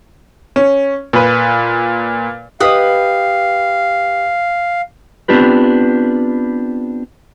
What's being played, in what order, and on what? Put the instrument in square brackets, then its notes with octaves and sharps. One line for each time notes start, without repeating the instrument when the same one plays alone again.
[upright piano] C#4
A#2 B4
[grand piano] G4 D#5 [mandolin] B4 D#6 [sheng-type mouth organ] F5
[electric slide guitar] B3 C4 D4 F4 G4 B4